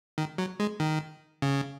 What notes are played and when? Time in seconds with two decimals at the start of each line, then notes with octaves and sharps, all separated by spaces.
0.18 D#3
0.38 F#3
0.60 G#3
0.80 D#3
1.42 C#3